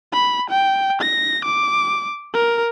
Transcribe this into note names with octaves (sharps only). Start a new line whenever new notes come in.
B5
G5
A#6
D6
A#4